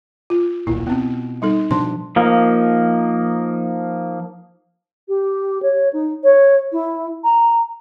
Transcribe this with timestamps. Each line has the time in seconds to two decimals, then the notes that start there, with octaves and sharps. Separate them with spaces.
0.30 F4
0.67 D#1 B1 A#2 E4
0.87 B2 B3 C4
1.42 G3 D#4 A4
1.71 B2 F3 D4 C6
2.16 F3 A#3 D#4
5.08 G4
5.62 C#5
5.93 D#4
6.24 C#5
6.72 E4
7.24 A#5